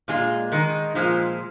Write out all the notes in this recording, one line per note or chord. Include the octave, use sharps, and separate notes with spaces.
A#2 G#3 F4
D#3 G#3 D#4
A#2 F3 G#3